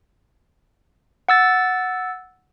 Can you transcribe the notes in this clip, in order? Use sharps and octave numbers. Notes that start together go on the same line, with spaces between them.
F#5 E6 A6